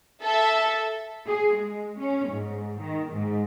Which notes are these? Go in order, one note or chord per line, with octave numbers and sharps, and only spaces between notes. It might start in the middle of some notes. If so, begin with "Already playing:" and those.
A4 E5
G#4
G#3
C#4
G#2
D#3
G#2